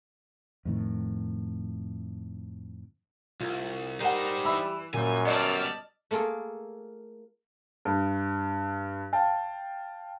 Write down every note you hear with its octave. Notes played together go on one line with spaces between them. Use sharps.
F2 A2 D#3
C2 F4
G3 D#4 A#4 C5 F#5
E3 E5 B5 E6
F#2 A#2 G3 G#5
G3 B3 D5 D#5 A5 E6 F6
A3 A#3 F4 G#4 A4
G2
F5 G5 A5